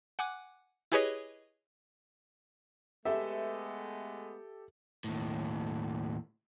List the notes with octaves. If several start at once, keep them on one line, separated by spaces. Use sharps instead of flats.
F#5 G#5 D6 F#6
E4 G4 G#4 B4 C#5 D#5
G#3 A3 B3 G4 A4 E5
D#2 A2